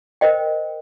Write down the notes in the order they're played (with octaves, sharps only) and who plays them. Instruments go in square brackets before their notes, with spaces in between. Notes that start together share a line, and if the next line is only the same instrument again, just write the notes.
[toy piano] A#4 C5 D#5 G5